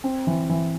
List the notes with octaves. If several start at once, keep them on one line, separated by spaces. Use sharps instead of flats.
C4
E3
E3